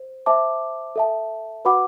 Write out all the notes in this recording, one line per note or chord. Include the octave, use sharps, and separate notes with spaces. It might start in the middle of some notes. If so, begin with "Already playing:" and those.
Already playing: C5
C5 E5 A5 D6
A4 E5 A5
F#4 B4 F#5 B5 D6